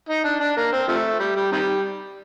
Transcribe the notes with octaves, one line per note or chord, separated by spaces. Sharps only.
D#4
D4
D4
A#3
C4
C3 F3 A3
G3
G3
C3 D#3 G3